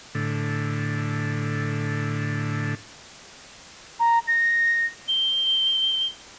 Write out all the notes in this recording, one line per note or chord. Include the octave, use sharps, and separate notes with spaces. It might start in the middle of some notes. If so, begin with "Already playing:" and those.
A2 D3
A#5
A#6
G7